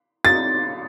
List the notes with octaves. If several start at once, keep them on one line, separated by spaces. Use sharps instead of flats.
A6